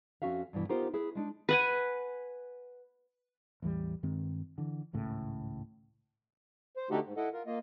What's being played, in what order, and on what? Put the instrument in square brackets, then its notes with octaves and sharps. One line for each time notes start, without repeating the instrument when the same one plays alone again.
[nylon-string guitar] F2 G#2 C#4 F#4 E5 F5
G2 B2 E3
B3 D#4 F4 G4 A#4 C5
E4 G#4 B4
G#3 D4 D#4
[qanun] B4 F#5 G#5
[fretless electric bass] A1 E2 E3 G3
G2 D#3 G#3 C4
D3 E3
G#1 C#2 A2 C#3
[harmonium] C5
D3 A3 D#4 F#4 G4 A4
G#2
E4 A4 D#5 F#5
F4 A#4
A#3 F4 D#5